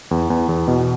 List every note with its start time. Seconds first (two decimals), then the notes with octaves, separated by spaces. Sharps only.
0.11 E2
0.30 E2
0.49 E2
0.68 B2